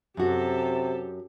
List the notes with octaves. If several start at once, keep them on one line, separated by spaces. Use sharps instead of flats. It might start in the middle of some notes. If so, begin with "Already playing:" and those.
F#2 C3 F#4 G4 A4